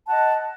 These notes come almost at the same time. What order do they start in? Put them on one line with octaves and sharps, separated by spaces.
A5 F#5 D#5